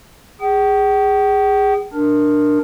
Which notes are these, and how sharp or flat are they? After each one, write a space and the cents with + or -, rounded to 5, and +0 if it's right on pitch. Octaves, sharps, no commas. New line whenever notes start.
G#4 -20 G5 -40
D4 +10 A#4 +0